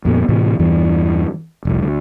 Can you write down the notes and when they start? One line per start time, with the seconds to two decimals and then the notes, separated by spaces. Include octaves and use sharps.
0.05 F2 A#2 B3
0.29 A2 C3 E3
0.59 E2 G2 E3
1.65 F1 C2
1.82 D2